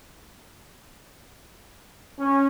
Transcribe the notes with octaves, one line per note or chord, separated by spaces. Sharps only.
C#4